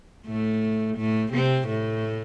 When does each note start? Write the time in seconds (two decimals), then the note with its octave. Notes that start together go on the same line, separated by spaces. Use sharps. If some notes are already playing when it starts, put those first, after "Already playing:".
0.26 A2 A3
0.97 A2 A3
1.32 C3 C4
1.68 A2 A3